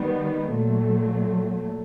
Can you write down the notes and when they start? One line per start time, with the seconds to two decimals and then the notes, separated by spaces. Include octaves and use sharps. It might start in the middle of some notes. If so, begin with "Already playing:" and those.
Already playing: D#3 G3 B3
0.53 A#2 F#3 A3